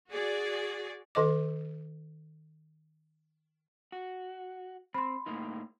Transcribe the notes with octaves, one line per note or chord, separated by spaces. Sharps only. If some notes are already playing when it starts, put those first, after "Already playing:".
F#4 G#4 D5
D#3 A4 D#5 D6
F#4
C4 B5 C6
A2 A#3 D#4